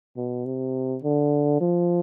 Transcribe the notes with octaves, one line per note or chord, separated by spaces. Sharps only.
B2
C3
D3
F3